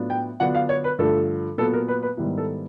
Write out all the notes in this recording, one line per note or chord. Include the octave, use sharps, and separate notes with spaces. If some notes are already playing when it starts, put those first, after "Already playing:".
Already playing: A2 F#3 B3 D4 F4
G5
D3 F#3 B3 D4 F4 F#5
F5
C#5
B4
G2 D3 F3 A3 A4
A#2 F#3 B3 A4
A#4
B4
B4
G#2 D#3 G3 B3 E4
A4